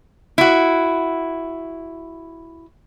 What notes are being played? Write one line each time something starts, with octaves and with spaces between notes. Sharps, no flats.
E4 F#4